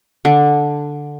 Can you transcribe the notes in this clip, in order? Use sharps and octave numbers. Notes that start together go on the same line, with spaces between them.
D3